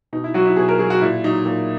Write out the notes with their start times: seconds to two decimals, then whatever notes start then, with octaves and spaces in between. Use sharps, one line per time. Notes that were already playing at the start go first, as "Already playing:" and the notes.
0.13 B2 D#4
0.24 E4
0.34 F#3 F#4
0.46 E4
0.56 B2 G#4
0.69 A#4
0.79 F#3 G#4
0.90 F#4
1.01 A#2 E4
1.24 F#3 D#4
1.46 A#2